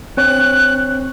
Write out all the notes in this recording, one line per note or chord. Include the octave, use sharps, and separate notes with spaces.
C4 C#5 F#6